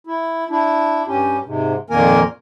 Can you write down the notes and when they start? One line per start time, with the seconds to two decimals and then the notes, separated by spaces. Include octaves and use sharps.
0.07 E4
0.50 D4 E4
1.08 G2 C#4 G4
1.46 G#2 C3
1.90 F2 A#2 D#3 A#3 A#4 G#5